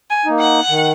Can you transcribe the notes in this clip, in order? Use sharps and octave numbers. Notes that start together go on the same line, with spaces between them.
G#5
A#3 D#4
F#5
D#3